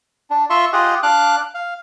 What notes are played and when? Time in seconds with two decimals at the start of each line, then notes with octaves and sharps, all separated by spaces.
0.30 D4
0.50 F4 E5 C6 C#6
0.73 F4 G4 G#4 D#5 F#5
1.03 D4 F5 D6 F#6
1.54 F5